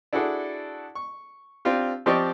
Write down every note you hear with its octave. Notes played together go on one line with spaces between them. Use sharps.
D4 E4 F#4 G#4 A4 D5
C#6
C4 D4 F4 G4
F3 C4 G4 D5 D#5 C#6